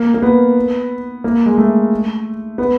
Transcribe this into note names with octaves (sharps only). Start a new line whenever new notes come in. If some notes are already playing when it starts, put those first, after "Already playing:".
Already playing: A#3
A#3
B3
A#3
G#3
A3
B3